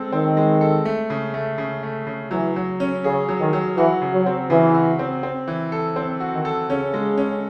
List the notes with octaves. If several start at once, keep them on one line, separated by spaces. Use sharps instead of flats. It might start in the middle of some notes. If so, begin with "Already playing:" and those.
Already playing: G#3 C4 A4
D#3 C4
G#3
A4
A3
C#3
A3
C#3
A3
C#3
E3 F#3
F#3
C#4
C#3 G#4
F#3
D#3
F#3
E3 F#4
C#3
F#3
C4
C#3 E3
F#4
C4
C4
E3
A4
C4
F#4
D#3
A4
C#3 C#4
G#3
C#4